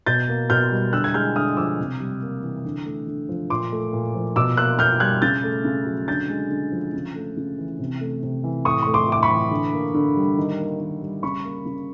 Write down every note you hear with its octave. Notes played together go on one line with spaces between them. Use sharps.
B2 G6 A6
A#3
B2 F6 G6
G3
D3 E6 F#6
G#6
G#3 F6 G6
D3 D#6 F6
F3 D6 E6
C3
G3
A#3
E3
D3
A3
D3
F3
A#2 C6 D6
A3
A#2
F3
B2 D6 E6
A#3 E6 F#6
B2 F6 G6
G3 F#6 G#6
C#3 G6 A6
A3
C#3
F#3
D3 G6 A6
G#3
D3
F3
C#3
A3
C#3
E3
C3
A3
C3
E3
A2 C#6 D#6
A3 C#6
C6 D6
A2 D6
B5 C#6
E3
D3
A#3
D3
G3
D#3
A#3
D#3
G3
C#3 B5 C#6
A#3
C#3